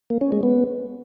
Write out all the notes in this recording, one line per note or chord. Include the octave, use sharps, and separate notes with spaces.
A#3
C#4
G#3
B3